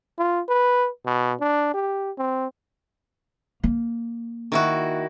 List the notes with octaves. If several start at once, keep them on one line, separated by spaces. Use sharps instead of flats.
F4
B4
B2
D4
G4
C4
A#3
D#3 E4 F#4